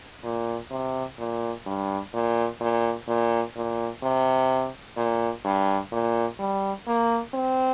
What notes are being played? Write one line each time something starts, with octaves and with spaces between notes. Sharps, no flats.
A#2
C3
A#2
G2
A#2
A#2
A#2
A#2
C3
A#2
G2
A#2
G3
A#3
C4